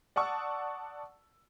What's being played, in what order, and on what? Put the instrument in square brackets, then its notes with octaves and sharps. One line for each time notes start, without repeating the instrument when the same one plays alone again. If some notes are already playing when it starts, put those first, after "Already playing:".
[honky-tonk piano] D5 F#5 A5 C#6 D#6 E6